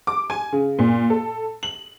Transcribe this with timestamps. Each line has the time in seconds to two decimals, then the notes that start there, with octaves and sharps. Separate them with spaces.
0.07 D6
0.30 G#5
0.52 C#3
0.79 A#2
1.10 A4
1.63 F#7